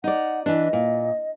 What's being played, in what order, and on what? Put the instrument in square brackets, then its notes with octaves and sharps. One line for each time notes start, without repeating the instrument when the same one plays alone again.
[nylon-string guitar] D#4 D5 [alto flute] F#5
[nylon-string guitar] E3 D4 [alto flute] D#5
[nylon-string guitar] A#2